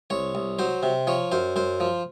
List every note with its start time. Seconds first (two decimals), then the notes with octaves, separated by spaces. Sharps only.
0.10 C2 C#5
0.35 C2
0.59 F#3 C5
0.83 C3
1.07 F3 C#5
1.32 F#2 C5
1.56 F#2 C5
1.80 F3